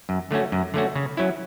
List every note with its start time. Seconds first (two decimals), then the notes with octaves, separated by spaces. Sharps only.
0.09 F#2
0.31 D3 A3 C#4 F#4
0.52 F#2
0.74 D3 A3 C#4 F#4
0.95 C#3
1.17 F#3 C#4 E4